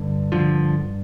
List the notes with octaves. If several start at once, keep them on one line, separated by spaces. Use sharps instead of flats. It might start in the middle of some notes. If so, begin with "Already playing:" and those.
Already playing: G2 D3
D3 F3